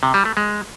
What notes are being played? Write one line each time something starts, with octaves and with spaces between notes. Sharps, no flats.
C3
G3
A3
G#3